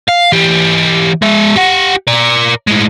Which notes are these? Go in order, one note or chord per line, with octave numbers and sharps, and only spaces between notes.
F5
E3 G4
G#3 E5
G4 F#5
A#4 D5
A2 G#3